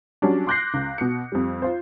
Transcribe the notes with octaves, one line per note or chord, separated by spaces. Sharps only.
F#3 G3 C#4 D4
C6 D6 F#6 G6 A#6 C7
C#2
B2 C#7
F2 G3
F4 C5